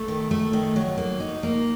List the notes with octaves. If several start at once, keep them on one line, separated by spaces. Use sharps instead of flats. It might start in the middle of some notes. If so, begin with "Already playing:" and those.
Already playing: A3
D#3
A3
D#3
F#3
A#3
D#4
A#3